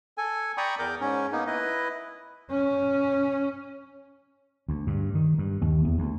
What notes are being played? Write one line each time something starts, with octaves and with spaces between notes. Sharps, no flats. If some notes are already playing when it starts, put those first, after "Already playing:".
A4 G#5
D5 G5 A#5 B5 C#6 D#6
E2 A#4 D6 G6
G#2 C#4
A#3 B3 D#4
E4 B4 D#5
C#4
D2
G2
D#3
G2
D#2
E2
D2